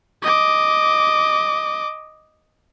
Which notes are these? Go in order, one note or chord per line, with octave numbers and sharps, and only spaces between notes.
D#5 D6